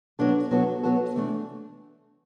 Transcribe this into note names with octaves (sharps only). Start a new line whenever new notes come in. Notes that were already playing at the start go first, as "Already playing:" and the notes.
F#3 B3 D4 A4
F#3 B3 F#4 A4
F#3 B3 F#4 A4
E3 A3 D4